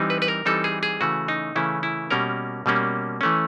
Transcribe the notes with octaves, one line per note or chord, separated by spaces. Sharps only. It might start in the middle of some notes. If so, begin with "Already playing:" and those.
Already playing: E3 G3 C4 D#4
B4
B4
A#4
E3 G3 C4 D#4 A4
G#4
G#4
C#3 E3 A3 C#4 F#4
D#4
C#3 E3 A3 C#4 E4
E4
B2 G3 A#3 C#4 A#4
B2 G3 A#3 C#4
E3 A3 C#4